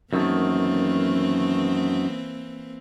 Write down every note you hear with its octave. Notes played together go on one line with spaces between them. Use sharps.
F#2 D#3 E3 A3 A#3 C4